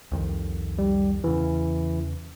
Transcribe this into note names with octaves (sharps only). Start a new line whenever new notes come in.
C2 F2 D#3
G3
E2 C#3 E3